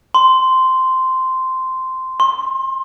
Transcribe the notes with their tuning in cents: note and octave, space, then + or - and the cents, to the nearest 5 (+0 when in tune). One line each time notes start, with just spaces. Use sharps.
C6 -10
C6 +30